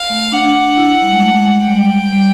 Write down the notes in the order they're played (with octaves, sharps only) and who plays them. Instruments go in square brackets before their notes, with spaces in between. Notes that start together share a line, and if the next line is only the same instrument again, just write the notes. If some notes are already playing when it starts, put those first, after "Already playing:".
Already playing: [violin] F5
[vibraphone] A3
[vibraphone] D4 [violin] F#5
[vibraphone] E4
E4
G3
G#3
A3
G#3
[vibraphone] G3 [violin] G5
[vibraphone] G3